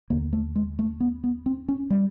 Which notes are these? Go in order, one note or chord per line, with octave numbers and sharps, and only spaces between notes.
D#2 D3 A#3
A3
G#3
A3
B3
B3
C4
C#4
G3